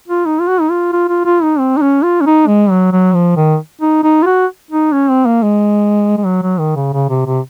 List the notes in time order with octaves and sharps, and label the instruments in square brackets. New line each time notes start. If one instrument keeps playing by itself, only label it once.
[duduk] F4
D#4
F4
F#4
D#4
F4
F4
F4
F4
D#4
C4
D#4
C#4
F4
C#4
D#4
G#3
F#3
F#3
F3
D#3
D#4
D#4
F4
F#4
D#4
C#4
C4
A#3
G#3
G#3
F#3
F#3
D#3
C#3
C#3
C3
C3